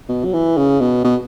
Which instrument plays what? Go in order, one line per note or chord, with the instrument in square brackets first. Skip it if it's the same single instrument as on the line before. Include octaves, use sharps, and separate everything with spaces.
[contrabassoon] B2
F#3
E3
C#3
B2
B2